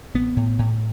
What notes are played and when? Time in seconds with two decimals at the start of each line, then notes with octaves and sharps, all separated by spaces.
0.14 A1 B3
0.36 A2
0.59 A2